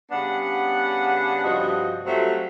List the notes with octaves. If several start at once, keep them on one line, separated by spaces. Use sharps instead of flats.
C#3 G3 B3 D4 F#5
G2 C3 F3 F#4 D#5
F#3 G3 A3 C4 F4 F#4